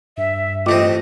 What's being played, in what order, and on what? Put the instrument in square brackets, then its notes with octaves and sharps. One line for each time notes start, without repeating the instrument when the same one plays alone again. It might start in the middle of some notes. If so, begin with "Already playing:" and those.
[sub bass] G2 [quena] E5
[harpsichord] A1 A3 C4 [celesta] F4 D6 [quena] D#5